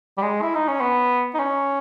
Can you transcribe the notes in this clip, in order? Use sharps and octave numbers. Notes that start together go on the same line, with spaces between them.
G3
G#3
E4
D#4
C#4
B3
D#4
C#4